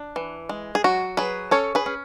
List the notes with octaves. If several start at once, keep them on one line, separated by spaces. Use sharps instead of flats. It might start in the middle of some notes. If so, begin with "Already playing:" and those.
Already playing: D4
E3
G#3
G#4
F#3 F#4
F#3 G#4 B4
C#4 A4 C#5
G#4 B4
C#4